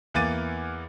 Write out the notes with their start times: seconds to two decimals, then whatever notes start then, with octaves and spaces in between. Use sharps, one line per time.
0.14 E2 E3 A#3 D6 A6 D#7